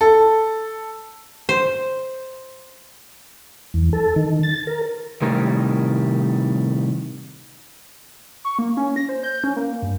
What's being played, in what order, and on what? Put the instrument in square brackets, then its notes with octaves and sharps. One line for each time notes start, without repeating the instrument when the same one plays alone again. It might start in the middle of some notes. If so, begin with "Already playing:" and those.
[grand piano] A4
[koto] C5
[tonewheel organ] E2
A4
D#3
A6
A#4
[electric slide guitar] A2 C3 D#3 G3 A#4
[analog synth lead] C#6
A#3
C#4
A#6
C5
G6
C#4
A#3
G2